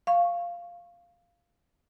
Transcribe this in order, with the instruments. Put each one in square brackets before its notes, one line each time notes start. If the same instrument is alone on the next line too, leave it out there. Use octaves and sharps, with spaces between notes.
[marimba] F5 C#6